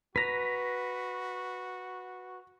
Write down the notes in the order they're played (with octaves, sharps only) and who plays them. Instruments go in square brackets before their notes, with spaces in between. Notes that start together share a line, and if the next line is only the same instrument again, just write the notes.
[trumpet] F#4 [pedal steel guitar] B4 A#5 [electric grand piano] A#6 B6